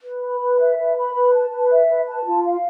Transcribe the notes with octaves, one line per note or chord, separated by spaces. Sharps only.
B4
B5
B4
E5
B4
B5
B4
A5
B4
E5
B4
A5
F4
F5